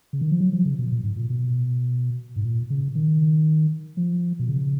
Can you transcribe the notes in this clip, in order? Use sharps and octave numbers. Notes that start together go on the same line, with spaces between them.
C#3
D#3
F3
F#3
F3
C#3
B2
A#2
G#2
A#2
B2
G#2
A#2
C#3
D#3
F3
B2
C#3